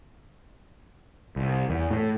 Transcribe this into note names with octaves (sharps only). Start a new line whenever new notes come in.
C2
E2
A2